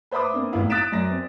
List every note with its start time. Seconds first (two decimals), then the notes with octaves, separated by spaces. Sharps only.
0.11 B4 C5 E5 B5 D6 D#6
0.33 A#3 C4 D4
0.52 G#1 A2 B3 E4 F5
0.70 D#6 F#6 A6 B6 D7 E7
0.92 F#2 D5 A#5 A#6
1.11 C4